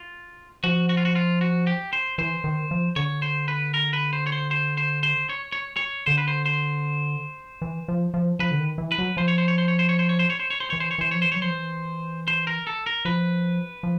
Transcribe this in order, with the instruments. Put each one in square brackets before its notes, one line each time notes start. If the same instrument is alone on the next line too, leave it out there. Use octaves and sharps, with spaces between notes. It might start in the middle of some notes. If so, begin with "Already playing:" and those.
Already playing: [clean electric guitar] F4
[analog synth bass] F3 [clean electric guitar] F#4
[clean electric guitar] F#4
F4
F#4
F4
F#4
G4
C5
[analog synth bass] E3 [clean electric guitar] C5
[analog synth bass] D#3
F3
[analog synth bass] D3 [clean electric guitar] C#5
[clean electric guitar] C5
B4
A#4
B4
C5
C#5
C5
C5
C5
C5
C#5
C#5
C#5
[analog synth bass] D3 [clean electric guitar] C5
[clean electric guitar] B4
C5
C5
[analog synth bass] E3
F3
F3
[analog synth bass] F3 [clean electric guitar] B4
[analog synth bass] D3
D#3
E3
[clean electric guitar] B4
[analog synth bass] F#3
[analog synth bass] F3 [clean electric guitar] C5
[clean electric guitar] C#5
C5
C#5
C5
C#5
C5
C#5
C5
C#5
C5
C#5
C5
C#5
C5
[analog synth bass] E3 [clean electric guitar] C#5
[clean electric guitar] C5
C#5
[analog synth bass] E3 [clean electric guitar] C5
[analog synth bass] F3 [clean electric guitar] C#5
[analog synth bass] E3 [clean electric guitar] C5
[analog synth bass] F#3 [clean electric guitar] C#5
[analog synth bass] F3 [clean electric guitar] C5
[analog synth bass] E3
[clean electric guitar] C5
A#4
A4
A#4
[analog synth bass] F3 [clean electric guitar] B4
[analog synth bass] F3